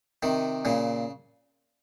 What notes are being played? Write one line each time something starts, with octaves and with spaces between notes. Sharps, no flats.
C3 D#3
A#2 C#3